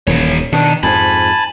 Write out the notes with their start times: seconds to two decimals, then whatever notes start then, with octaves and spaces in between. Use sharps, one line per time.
0.07 D#1 D#2 E3 C#5
0.53 B2 D#3 D4
0.83 F2 G#2 G#5 A5 B5